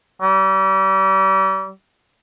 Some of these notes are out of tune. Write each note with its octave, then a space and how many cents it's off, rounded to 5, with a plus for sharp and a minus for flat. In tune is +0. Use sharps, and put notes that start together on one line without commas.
G3 -35